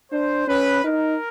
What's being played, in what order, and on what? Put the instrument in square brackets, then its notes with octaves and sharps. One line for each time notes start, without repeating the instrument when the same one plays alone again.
[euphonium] D4 [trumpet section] C5
[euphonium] C#4 [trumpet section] B4
[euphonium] D#4 [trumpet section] A#4